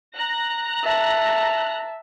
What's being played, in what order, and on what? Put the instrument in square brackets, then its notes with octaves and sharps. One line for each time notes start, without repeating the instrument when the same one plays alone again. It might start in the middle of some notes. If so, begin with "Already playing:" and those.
[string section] A#5 F#6 A#6
[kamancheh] E5 A5